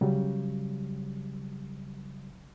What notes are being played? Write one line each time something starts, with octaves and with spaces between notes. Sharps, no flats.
C#3 F#3 G3